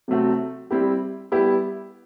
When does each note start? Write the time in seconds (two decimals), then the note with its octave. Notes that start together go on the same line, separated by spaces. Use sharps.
0.08 C3 F#3 A3 C4 F#4
0.71 G3 C4 E4 G4
1.32 G3 B3 E4 G4